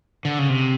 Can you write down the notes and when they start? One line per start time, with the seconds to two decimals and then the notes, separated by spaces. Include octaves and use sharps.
0.25 D3
0.39 C#3
0.49 C3